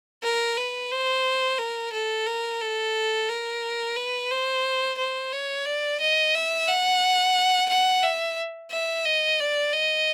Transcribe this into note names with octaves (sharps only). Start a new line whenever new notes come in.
A#4
B4
C5
A#4
A4
A#4
A4
A#4
B4
C5
C5
C#5
D5
D#5
E5
F#5
F#5
E5
E5
D#5
D5
D#5